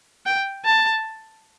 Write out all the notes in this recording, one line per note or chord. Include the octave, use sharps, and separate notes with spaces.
G5
A5